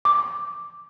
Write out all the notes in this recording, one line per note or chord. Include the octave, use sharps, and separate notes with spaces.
D6